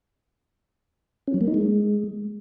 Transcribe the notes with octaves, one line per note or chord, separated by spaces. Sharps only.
C#4
F#3
A#3
D#4
G#3